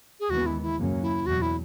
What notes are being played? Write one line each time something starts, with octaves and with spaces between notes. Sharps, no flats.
G#4
D#2 C#3 E3 G#3 B3 F#4
E4
E4
F#2 C#3 F#3 A#3 C#4
E4
E2 B2 F#3 F#4
E4